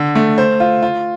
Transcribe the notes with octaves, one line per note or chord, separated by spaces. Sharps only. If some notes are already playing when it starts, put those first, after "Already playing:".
Already playing: D3
A3
C5
F4
F4